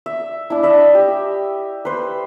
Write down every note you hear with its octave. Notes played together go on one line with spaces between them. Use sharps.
E5
D4 E4
D#5 E5 B5
G4
B4 C5